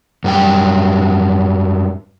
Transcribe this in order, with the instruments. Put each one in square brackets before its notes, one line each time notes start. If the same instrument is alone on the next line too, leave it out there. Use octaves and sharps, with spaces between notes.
[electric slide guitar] F#2 G3 G5